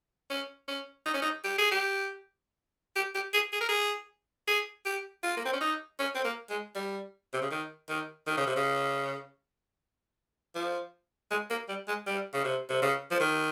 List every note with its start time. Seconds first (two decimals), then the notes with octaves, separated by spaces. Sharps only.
0.30 C#4
0.68 C#4
1.06 D#4
1.14 C#4
1.22 D#4
1.44 G4
1.58 G#4
1.71 G4
2.96 G4
3.15 G4
3.33 G#4
3.53 G#4
3.60 A#4
3.69 G#4
4.47 G#4
4.85 G4
5.23 F4
5.37 A#3
5.45 C4
5.53 C#4
5.61 D#4
5.99 C#4
6.15 C4
6.24 A#3
6.50 G#3
6.75 G3
7.33 C3
7.41 C#3
7.51 D#3
7.89 D#3
8.27 D#3
8.37 C#3
8.47 C3
8.56 C#3
10.55 F3
11.31 G#3
11.50 A#3
11.68 G3
11.88 G#3
12.06 G3
12.33 C#3
12.44 C3
12.69 C3
12.82 C#3
13.11 F3
13.20 D#3